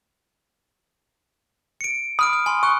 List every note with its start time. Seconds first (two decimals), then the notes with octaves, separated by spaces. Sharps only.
1.81 C#7 D7
2.19 B5 D#6 F6 D7
2.33 F6
2.46 G#5 B5 C6
2.63 C#6 D#6 F#6